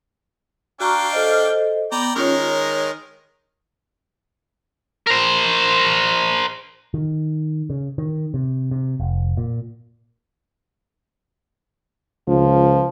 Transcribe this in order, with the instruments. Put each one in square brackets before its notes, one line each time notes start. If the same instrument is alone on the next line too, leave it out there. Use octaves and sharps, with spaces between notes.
[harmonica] D4 F5 G5 [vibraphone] F#4 A#5 C#6
[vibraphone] A4 C5 D#5
[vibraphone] B3 [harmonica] D5 G5 A#5
[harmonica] D#3 G#3 A#4 [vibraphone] C#4 F4 C#5
[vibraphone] C#5
[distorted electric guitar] A#4 C5
[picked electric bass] D#3
C#3
D#3
C3
C3
F1
A#2
[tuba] C#2 [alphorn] F3